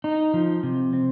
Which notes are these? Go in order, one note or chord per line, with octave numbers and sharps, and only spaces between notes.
D#4
F3
C3
C4